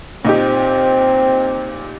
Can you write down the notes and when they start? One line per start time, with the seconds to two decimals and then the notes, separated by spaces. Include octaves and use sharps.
0.25 A#2 C4 D#4 G4